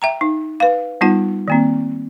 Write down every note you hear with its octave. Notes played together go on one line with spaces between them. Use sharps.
E5 G5 A#5
D#4
B4 F5
G3 B3 D#4 F4 F#5
D#3 A#3 C4